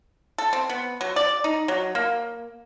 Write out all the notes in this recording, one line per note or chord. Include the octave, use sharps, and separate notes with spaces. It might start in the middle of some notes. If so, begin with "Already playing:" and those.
A4
C4
B3
F#3
D5
D#4
F#3
A#3